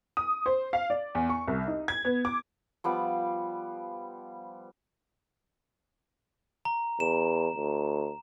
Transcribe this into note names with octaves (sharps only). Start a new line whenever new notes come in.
D#6
C5
F5
D5
E2
C#6
C2
D#4
G#6
B3
D6
F3 G3 B3
A#5
E2 E7
D2